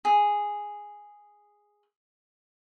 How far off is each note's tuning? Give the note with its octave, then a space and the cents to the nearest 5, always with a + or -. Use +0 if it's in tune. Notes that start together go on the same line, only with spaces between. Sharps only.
G#4 -5